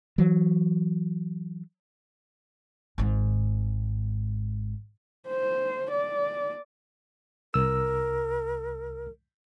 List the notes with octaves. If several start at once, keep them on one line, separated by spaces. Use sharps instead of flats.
E3 F#3
G#1 G#2
C5
D5
C2 A#4 E6